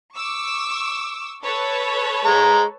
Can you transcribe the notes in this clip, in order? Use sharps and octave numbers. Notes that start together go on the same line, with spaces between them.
C#6 D6 E6
A4 B4 C#5
G#3 A#5